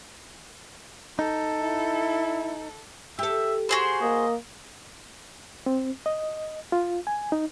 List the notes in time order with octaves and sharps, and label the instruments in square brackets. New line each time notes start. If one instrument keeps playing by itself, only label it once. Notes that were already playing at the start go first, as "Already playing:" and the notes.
[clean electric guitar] D#4 [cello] A4
[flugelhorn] E4
[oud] G4 A4 [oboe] E5
[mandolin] F#4 G#4 C5 [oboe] C6
[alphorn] A#3 [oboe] D#5
[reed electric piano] C4
D#5
F4
G#5
D#4